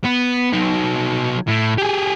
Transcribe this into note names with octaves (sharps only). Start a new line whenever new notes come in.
B3
F#3 D#4
A2
G4 G#4